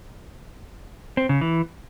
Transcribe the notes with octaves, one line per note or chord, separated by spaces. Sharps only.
C4
C#3
E3